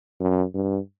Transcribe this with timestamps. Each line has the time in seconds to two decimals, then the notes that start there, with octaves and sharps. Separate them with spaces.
0.20 F#2
0.54 G2